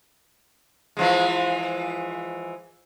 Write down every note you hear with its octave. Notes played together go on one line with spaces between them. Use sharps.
E3 F3 G#3